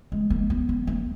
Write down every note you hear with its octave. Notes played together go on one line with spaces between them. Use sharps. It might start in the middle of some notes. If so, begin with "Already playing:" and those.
G#3
A#3
B3
B3
A#3